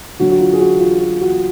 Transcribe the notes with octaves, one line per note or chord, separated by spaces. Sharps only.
D3 F#3 D4 F#4
F#4
F4
G#4
F#4
F4
F#4
F#4